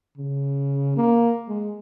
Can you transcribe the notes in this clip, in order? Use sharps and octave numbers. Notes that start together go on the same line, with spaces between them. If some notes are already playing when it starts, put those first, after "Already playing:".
C#3
A#3
G#3